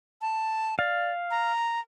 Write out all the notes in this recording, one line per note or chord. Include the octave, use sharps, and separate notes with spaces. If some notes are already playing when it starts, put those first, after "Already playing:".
A5
D5 F5
A#5